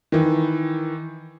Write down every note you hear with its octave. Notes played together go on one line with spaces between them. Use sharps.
D#3 E3